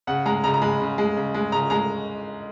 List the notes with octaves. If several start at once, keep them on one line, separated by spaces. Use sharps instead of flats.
C#3 F#5
G#3 A#5
C#3 A#5
A#5
G#3 B5
C#3
G#3
C#3
G#3
C#3 A#5
G#3 A#5